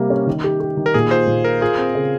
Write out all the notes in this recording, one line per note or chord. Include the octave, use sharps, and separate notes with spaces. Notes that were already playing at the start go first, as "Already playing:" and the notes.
Already playing: C3 G3 A#3
C#4
D#3
G4
G4
D#3
A#4
A#2 G#4
F4 C5
A#2
F4 A#4
F4 G#4
C4
C#3